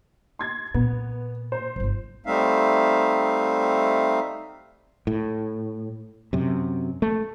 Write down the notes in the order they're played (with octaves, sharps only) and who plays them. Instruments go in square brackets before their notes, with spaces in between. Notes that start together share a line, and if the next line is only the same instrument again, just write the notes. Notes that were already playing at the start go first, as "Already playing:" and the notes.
[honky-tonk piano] C6 G#6 A6
[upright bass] A#2 [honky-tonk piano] B3
[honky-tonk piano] C5
[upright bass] D1 G1
[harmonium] G3 A3 C4 D#4 E5 F5
[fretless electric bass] A2
F#2 C3
A3